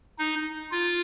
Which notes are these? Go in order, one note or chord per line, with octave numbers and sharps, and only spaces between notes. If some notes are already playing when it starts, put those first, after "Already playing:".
D#4
F4